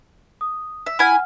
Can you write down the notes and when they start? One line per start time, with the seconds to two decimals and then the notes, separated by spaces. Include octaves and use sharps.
0.41 D#6
0.86 E5
0.99 E4 F#5 G#5 F6